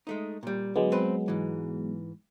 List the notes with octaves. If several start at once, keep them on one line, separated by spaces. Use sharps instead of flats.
G#3 A3 D#4
A#2 G3
D3 F#3 G#3 B3
C4 B4
G#2 E3